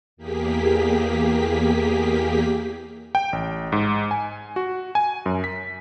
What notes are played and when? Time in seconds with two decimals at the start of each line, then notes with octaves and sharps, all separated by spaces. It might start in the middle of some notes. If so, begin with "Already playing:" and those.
0.17 E2 A#3 G4 G#4 B6
3.15 G5
3.33 A1
3.72 G#2
4.11 G#5
4.56 F#4
4.95 G#5
5.26 F#2
5.44 B6